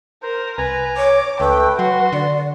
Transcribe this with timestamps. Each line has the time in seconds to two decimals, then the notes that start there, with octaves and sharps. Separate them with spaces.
0.23 A#4 C5
0.58 C2 B4 G#5 A#5
0.97 C#5 D6
1.40 C#2 A3 B4 G5
1.79 F#3 F#4 C6
2.13 D3 D5